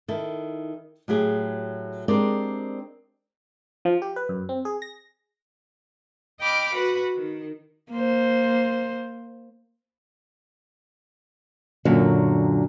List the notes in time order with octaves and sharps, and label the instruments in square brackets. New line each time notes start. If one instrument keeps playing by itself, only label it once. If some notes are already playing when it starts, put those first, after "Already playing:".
[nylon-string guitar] D#3 E4 A4
A2 F#3 G4 G#4
G#3 C4 D4 G4 A#4 D5
[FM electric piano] F3
G4
B4
F#2
C4
G#4
A#6
[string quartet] D#5 G5 B5 D6 F6
F#4 B4
D#3
[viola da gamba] A#3 C5
[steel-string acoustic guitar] F#2 A#2 D3 F#3